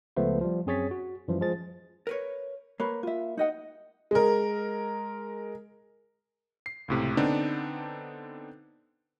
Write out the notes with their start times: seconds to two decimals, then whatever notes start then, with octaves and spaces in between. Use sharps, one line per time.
0.17 C#2 F3 A3 B3 B4 C5
0.41 F3 G3
0.66 F#2 C4 G#4 C#5 A6 B6
0.91 F#4
1.28 F#2 E3 F3 G3
1.41 F3 G#3 G#4 C5 A6
2.07 A#4 B4 C#5
2.80 A#3 A#4 B4 C#5
3.03 F4 E5
3.37 D#4 D#5 F#5
4.11 G#3 A#4
6.66 C7
6.88 C#2 A2 C3
7.17 D3 B3 C4 D4 D#4